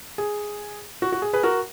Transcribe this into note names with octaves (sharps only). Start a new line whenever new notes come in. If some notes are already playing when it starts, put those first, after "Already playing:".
G#4
F#4
F#4
G#4
G#4 B4
F#4 A#4